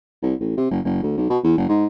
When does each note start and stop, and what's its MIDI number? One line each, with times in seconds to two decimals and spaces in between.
0.22 0.34 36
0.40 0.53 33
0.57 0.70 48
0.71 0.79 30
0.85 0.99 30
1.03 1.16 38
1.17 1.26 35
1.30 1.39 47
1.44 1.55 40
1.57 1.65 30
1.69 1.86 44